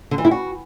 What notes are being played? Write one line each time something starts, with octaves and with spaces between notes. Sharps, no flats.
D3
E3
E4
F#4